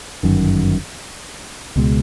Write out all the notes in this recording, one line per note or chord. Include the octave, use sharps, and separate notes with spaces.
G1 F#2 D#3
C#2 B2 G#3